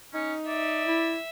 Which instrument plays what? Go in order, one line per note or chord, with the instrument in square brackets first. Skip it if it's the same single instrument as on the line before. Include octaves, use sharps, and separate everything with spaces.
[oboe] C#4 [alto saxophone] D#4
[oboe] D5 [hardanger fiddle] E5
[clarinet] E4